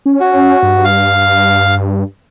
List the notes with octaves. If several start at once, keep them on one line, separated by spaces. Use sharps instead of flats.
C#4
F#4
G2
F5